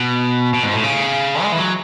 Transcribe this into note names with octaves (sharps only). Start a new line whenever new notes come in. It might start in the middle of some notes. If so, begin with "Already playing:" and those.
Already playing: B2
B2
G#2
A2
C#3
G#3
E3
F#3